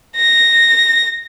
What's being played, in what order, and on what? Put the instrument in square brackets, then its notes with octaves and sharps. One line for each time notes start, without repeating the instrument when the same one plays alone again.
[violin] A#6